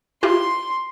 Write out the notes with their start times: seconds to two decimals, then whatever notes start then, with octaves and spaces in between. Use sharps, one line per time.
0.23 E4 F4 G4 C6